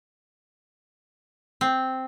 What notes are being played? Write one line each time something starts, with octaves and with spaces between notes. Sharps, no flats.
C4